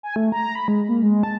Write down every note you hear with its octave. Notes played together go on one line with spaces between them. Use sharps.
G#5
A3
A#5
B5
G#3
A#3
G#3
A5